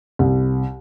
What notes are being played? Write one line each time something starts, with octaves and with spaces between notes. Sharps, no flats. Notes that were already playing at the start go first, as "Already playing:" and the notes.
C2